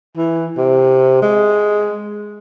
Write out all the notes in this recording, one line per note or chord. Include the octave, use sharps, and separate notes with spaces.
E3
C3
G#3